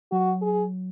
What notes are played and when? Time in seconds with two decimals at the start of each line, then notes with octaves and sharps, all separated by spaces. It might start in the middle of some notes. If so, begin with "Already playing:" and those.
0.12 F#3 F#4
0.42 G#4